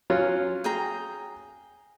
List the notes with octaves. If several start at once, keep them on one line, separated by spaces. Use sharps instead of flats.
F#3 C#4 F4
G#4 G5 A#5